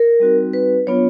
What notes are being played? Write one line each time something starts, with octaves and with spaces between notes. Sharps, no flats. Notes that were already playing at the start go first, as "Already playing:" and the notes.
Already playing: A#4
G3 C4 D#4 F#4
B4
F#3 B3 D4 F4 C#5